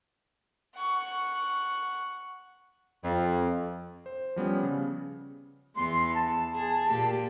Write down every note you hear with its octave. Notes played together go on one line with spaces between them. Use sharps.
F#5 C#6
F2
C5
F3 G3 B3 C#4
C#3
E2 B3 C6
A5
G#4
A#2 A#3 G4